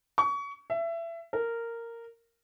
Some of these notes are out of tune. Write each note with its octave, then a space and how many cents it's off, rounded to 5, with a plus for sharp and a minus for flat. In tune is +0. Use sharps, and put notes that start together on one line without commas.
C#6 +30
E5 +25
A#4 -10